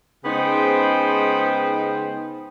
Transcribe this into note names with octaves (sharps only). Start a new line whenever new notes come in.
C#3 G#3 B3 D#4 C5 G5